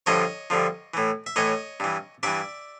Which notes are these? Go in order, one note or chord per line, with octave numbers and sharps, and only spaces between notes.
G2 D3 F3 C#5 D#5
G2 D3 F3
A2 E3
E5
A2 E3 C#5 D#5
G2 E3
G2 E3 D5 E5